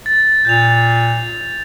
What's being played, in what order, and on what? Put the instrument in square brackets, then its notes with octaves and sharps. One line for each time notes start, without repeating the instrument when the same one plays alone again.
[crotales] A6
[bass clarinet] A#2 [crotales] G6 A6 F7